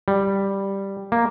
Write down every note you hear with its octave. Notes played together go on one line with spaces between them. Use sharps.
G3
A#3